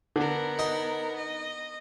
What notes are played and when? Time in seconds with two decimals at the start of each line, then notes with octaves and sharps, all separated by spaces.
0.16 D3 B3 A#4
0.59 D#4
1.16 D#5